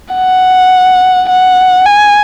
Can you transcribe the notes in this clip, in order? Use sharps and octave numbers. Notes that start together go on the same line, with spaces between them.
F#5
F#5
G#5